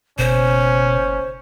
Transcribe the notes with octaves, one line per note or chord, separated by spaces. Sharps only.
F#1 B2 C#4 C5